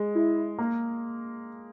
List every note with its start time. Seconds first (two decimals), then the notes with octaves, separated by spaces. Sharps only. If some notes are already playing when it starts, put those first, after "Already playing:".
Already playing: G#3
0.15 E4
0.58 A#3